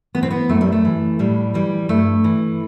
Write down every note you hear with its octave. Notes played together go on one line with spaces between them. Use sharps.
E3 B3
C4
B3
F#2 A3
G3
A3
E3
A2 G3
E3 G3
G2 A3
E3